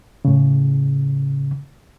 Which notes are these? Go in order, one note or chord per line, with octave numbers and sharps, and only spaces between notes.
A2 C#3